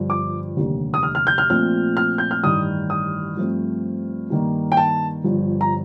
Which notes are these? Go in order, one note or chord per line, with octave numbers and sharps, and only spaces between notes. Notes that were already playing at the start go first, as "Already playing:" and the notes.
Already playing: G1 G2 F3
D6
F1 D#2 D3 G3 A#3
D#6
F6
F6
G6
F6
A#1 A#2 A3 C4 F6
F6
G6
F6
A1 G2 D#3 D#6
D#6
G2 F3 A3 C4
G2 D#3 A#3
G5
A5
G1 G2 F3
A#5